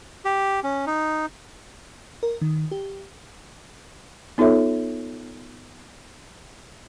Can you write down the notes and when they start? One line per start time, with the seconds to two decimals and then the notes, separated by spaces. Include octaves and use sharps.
0.25 G4
0.63 C#4
0.87 D#4
2.23 A#4
2.41 D#3
2.71 G4
4.38 B3 D#4 F4 A4 C#5 E5